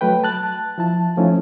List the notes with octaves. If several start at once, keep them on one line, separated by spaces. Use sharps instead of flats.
F#3 A3 B4 G5
A5 F#6 A6
F3 E4 A5
F3 A3 C#4 D#4 E4